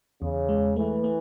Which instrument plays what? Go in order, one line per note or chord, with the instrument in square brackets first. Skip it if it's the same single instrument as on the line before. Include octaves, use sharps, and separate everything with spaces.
[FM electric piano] E2 [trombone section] C#3
[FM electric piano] G#3
[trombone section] E3 [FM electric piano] A3
[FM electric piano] A3